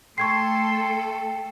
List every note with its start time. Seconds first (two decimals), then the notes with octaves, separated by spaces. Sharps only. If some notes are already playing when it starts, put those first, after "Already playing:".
0.18 A3 A4 G5 C6 C#6 G#6 C7